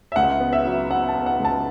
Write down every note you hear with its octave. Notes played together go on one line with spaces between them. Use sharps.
E5
C#2 F#5
B3
E5
F#3
B3 F#5
A5
B3
F#5
C#2
A5